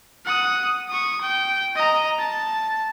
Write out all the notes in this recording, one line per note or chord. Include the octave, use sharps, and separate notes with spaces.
F#5 D#6
C#6 D#6
G5
D#5 A#5
A5